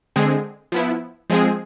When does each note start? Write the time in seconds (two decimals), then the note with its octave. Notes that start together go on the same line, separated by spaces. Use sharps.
0.16 D3 G#3 C4 G#4
0.72 F3 B3 E4
1.30 F3 G#3 C4 G#4